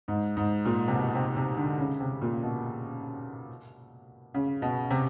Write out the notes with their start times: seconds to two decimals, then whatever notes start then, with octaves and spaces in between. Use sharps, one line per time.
0.08 G#2
0.37 G#2
0.65 A#2
0.88 C3
0.94 B2
1.15 C3
1.36 C3
1.57 D3
1.79 C#3
2.00 C3
2.22 A#2
2.43 B2
4.34 C#3
4.62 B2
4.90 C3